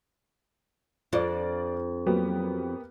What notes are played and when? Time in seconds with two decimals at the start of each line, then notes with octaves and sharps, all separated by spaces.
1.13 F2 D4 F4 D5
2.07 F#3 A#3 B3 G4